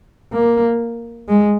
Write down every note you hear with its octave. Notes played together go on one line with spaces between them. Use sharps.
A#3
G#3